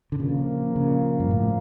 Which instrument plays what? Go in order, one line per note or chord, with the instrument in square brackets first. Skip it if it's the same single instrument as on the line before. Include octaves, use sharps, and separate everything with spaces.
[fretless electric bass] D3
[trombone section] A#2 F3 A#3 [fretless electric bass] C#3
[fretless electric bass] C#3
G2
A2